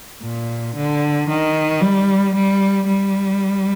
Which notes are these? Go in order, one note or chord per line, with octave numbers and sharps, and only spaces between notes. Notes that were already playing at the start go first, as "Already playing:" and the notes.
A#2
D3
D#3
G3
G3
G3